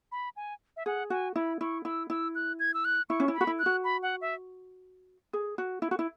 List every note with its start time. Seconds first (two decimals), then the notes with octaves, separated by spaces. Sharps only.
0.12 B5
0.36 G#5
0.77 E5
0.86 G#4 F#5
1.10 F#4 G#5
1.36 E4 B5
1.61 E4 C#6
1.85 E4 E6
2.10 E4 E6
2.35 F#6
2.60 G#6
2.74 E6
2.85 F#6
3.10 E4 C#6
3.20 C#4
3.28 E4
3.34 B5
3.41 F#4
3.47 E4
3.59 F#6
3.66 F#4
3.84 B5
4.03 F#5
4.21 E5
5.33 G#4
5.58 F#4
5.82 E4
5.91 F#4
5.99 E4